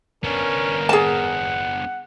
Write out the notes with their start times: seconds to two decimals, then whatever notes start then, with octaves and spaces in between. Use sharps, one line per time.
0.24 B3 C#4 D4 A#4
0.89 G#4 F#5 A5